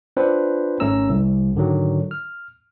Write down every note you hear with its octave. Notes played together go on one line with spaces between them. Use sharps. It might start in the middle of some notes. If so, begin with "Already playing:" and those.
C4 D4 F4 B4 C5
G#1 D#3 A3 C#4 A#5 E6
C2
G#2 D3 D#3 F#3
F6